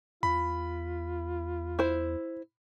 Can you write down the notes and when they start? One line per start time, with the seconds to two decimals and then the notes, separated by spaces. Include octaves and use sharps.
0.23 E2 F4 B5
1.79 E4 C5